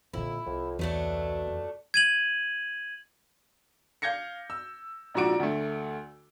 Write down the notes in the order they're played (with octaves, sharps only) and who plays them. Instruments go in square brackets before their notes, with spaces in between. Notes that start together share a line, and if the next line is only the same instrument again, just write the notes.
[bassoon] F2 [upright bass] A#2 D3 [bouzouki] E4
[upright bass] C2 [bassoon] F2
[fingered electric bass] E2 [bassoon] B2 [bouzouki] F#3 A3 D4
[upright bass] F2
[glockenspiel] G#6 D#7 F#7
[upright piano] F5 G6 G#6 A#6 C#7
E6
A#1 G#2 F3 F#4 D5 D7
D2 A3